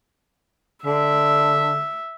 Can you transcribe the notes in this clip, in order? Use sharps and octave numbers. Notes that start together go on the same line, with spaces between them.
D3 E5